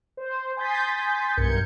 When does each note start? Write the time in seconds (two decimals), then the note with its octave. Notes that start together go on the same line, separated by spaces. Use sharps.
0.17 C5
0.57 G#5 C6 D#6 G6 A6 B6
1.37 B1 G2 A#4 G6 G#6 C#7